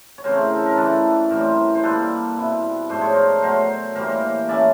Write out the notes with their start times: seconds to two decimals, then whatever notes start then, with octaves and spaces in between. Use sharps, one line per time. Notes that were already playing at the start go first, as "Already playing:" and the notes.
0.18 C#5
0.24 C#3 E3 A3 C4 A#4 C5
0.54 A4
0.66 A#4
0.77 E3 A3 D4 A4 B4
1.30 A2 E3 G3 C4 A#4 C5
1.75 C5
1.83 A#2 G3 A#3 A4 B4
2.37 B2 G3 C4 E4
2.89 G#2 F3 A3 D4 C5
3.01 C#5
3.13 A#4 C5
3.42 B2 F#3 A3 A#4 C5
3.95 A2 E3 G3 A#3 A#4 C5
4.49 E3 A3 C#4 D5 E5